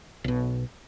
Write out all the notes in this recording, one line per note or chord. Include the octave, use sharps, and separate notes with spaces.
B1 B2